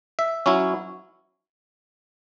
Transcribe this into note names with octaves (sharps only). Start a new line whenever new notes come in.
E5
F#3 C#4 E4